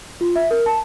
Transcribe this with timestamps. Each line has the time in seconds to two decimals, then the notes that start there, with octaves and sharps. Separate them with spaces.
0.21 F4
0.36 E5
0.51 A#4
0.66 A5